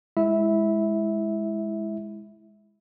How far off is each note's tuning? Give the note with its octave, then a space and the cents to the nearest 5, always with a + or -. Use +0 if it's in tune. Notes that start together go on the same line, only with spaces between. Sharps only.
G#3 +0 E4 +0 E5 -15